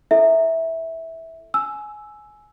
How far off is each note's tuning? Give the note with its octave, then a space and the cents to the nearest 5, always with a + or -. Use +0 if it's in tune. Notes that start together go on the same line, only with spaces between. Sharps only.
E4 +25 A4 +0 E5 -15
G#5 +20 E6 +0